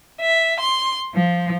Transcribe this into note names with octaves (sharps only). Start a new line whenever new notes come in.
E5
C6
F3